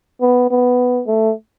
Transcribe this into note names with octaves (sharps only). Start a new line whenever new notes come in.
B3
B3
A3